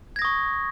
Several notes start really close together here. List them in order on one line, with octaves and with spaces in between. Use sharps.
G#6 A#6 D#6 C#6